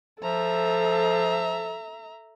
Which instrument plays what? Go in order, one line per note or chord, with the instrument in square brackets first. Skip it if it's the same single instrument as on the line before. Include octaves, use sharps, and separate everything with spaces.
[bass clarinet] F3 [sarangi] A4 [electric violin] E5 A#5